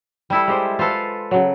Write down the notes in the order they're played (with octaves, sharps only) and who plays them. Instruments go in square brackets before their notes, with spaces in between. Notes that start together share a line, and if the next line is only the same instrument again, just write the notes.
[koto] G3 E4 A4
[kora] G#3 G4 C5
[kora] F4 C5 [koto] A4 B4 F5
[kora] C#3 F#3